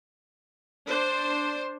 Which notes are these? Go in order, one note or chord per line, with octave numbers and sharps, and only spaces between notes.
D4 C5